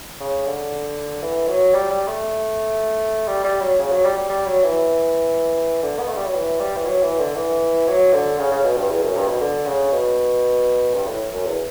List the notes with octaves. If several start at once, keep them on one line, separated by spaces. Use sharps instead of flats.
C#3
D3
E3
F#3
G3
G3
A3
G3
G3
F#3
C#3
F#3
G3
G3
G3
F#3
E3
D3
B3
A3
G3
F#3
E3
G3
E3
F#3
E3
D3
E3
F#3
D3
C#3
C#3
B2
G2
E2
F#2
G2
B2
D3
C#3
B2
G2
A2
F#2
E2